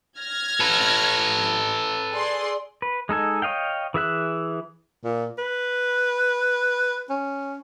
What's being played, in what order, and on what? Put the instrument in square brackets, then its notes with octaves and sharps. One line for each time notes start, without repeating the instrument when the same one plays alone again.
[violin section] F6 G#6 A#6
[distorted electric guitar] A4 B4
[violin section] G#4 D5 C6
[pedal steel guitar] B4
G#3 D#4 A4 G#5
C#5 D#5 F5 G5
E3 G#4 E5 F#6
[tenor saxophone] A#2
B4
C#4